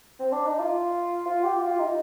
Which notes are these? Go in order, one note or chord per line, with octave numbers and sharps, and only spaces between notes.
C4
D4
D#4
F4
F4
G4
F4
D#4